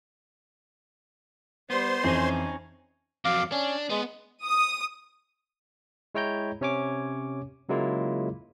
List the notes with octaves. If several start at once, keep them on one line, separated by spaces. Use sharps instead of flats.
G3 B3 C5 C6
F2 E3 C4 C#4 D#4
F2 F#3 F5 D6
C#4 D4
G#3 B3
D#6
G#3 E4 C#5 G5 A#5 G6
C3 C#4 C#5 G#5 D6
C#3 F#3 G#3 A#3 E4 F4